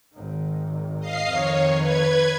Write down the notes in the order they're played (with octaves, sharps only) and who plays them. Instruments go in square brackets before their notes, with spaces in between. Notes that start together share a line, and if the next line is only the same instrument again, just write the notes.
[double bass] G#1 D#3
[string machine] D#5 F5 C7
[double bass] F2 D#3 [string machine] C#5
[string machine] B4 G#6